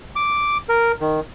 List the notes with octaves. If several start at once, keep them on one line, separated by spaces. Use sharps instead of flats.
D6
A#4
D#3